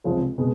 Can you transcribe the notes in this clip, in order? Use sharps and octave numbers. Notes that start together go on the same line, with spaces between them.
C#2 C3 F3 G#3
B2 G#3 B3